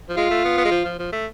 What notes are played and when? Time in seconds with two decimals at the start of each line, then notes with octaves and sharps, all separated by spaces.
0.09 F3
0.17 G#3 F4
0.30 A3
0.45 B3
0.57 B3
0.65 G#3
0.71 F3
0.85 F3
0.99 F3
1.12 A3